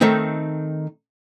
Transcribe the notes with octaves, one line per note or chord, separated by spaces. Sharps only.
D#3 A3 C4 D#4